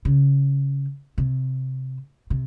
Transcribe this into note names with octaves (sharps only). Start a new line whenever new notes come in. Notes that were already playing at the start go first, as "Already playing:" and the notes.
C#3
C3
C3